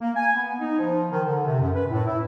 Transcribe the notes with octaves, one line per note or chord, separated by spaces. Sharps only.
A#3
G#5
B3
D#4
F3
D#3
D3
C3
F#2
B4
A2
E4